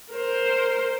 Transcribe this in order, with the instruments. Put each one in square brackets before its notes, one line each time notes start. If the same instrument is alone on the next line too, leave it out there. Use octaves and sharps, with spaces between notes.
[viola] A#4 C5